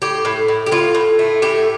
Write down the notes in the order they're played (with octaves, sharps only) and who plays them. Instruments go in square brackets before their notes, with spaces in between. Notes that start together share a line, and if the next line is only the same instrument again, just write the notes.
[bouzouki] A2 G4
A2
A2
G4
A2 F4
A2
A3
A2 G4